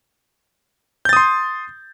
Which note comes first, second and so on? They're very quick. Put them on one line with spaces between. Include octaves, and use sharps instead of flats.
G6 A6 D#6 C6